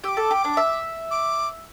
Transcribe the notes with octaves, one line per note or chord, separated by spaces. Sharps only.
G4 D6 E6
A4
G4
D4
E5
D6